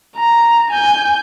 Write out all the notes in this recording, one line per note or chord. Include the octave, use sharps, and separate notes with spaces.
A#5
G#5 G6